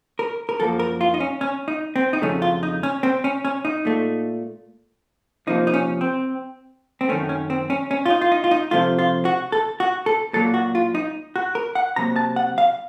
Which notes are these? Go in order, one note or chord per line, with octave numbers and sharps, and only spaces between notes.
A#4
A#4
F#2 F3 A#3 A4
A#4
F4
D#4
C#4
C#4
D#4
C4
D#4
F2 C#3 F#3 A3 C#4
F4
D#4
C#4
C4
C#4
C#4
D#4
A#2 A3
C3 F3 A#3 D#4
D#4
C#4
C4
C4
F#2 D#3 A3 C#4
C#4
C4
C#4
C#4
F4
D#4
F4
D#4
F4
D#4
C3 F3 A3 F4
F4
F#4
A4
F#4
A4
A#2 F#3 A#3 A4
F#4
F4
D#4
F#4
A#4
F#5
C3 F#3 A#3 A#5
A5
F#5
F5